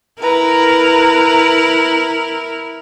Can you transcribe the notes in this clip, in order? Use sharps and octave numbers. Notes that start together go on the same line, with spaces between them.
E4 A#4 B4 A#5